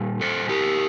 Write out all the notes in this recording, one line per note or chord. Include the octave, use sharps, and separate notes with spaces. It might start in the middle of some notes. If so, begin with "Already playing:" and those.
Already playing: A#2 G3
A4 C5
G4 A#4